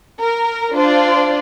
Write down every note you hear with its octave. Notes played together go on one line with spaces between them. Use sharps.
A#4
D4 F4 C5 D5